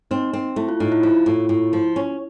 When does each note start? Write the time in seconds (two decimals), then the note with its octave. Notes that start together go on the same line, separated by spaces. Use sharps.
0.11 C4 D#4
0.33 C4
0.56 A3 E4
0.69 F4
0.80 A2 D#4
0.92 E4
1.03 F3 F4
1.26 A2
1.49 A2
1.73 F3
1.96 C#4